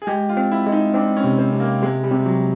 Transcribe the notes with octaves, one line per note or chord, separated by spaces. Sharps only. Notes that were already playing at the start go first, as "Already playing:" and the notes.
G#4
G#3 G4
F4
C4
E4
G#3
D#4
C4 D4
C#4
C3
C4
C3
A#3
C3 G#3
G3
C3
F#3